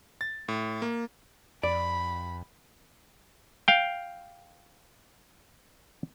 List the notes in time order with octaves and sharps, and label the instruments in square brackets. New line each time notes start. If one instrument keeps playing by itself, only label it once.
[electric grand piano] A6
A2
A#3
[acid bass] F2 [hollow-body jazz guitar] D5 [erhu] B5
[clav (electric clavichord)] F5 G5